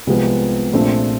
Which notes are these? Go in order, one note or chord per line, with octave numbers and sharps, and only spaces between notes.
C2 C3 F3 G#3 B3
A#1 A#2 F3 A3 C4